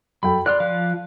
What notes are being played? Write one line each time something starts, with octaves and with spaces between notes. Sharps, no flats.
F#2 A4 G5 B5
D5 C6 F6 F#6
F3 F5 F#6